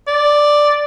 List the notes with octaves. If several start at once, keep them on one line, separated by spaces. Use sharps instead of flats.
D5